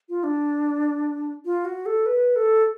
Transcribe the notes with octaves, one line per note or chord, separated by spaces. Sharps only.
F4
D4
F4
F#4
A4
B4
A4